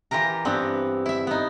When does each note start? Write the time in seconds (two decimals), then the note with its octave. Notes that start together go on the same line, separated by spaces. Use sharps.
0.11 E3 F4 G4 A#4 A#5
0.45 G2 B3 C4
1.06 E4 E5
1.27 B3 D#4